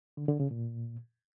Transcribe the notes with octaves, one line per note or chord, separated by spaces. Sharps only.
D3
D3
C#3
A#2